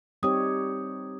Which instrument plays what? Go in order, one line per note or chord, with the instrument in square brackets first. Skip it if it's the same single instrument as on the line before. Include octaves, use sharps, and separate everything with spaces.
[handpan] G3 C4 D#4 G4 C#5 [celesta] D#6